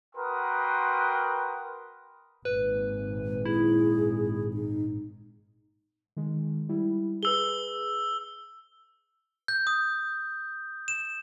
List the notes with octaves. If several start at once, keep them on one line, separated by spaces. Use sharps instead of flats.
F#4 A#4 B4 G5 C6 D#6
G#1 A#2 B4
E4 G#4
D#4
D#3 G#3
G3 E4
G#4 B4 E6 G7
G6
D#6
E7